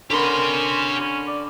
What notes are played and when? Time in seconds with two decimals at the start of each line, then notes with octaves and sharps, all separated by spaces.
0.11 D3 C#4 G4 A#4 B5 C6
1.01 C#4
1.27 D5